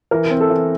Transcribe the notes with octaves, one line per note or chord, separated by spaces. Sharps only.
E3 A#4
C4
A4
E3